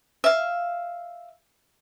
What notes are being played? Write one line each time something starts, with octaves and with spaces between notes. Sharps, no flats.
E5 F5